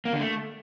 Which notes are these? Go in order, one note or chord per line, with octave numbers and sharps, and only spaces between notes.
A#3
D3
A3